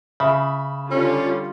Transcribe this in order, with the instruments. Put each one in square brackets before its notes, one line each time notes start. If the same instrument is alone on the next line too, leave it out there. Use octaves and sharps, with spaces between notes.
[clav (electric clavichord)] C#3 [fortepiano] E5 B5
[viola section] D3 G3 F4 [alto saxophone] C#4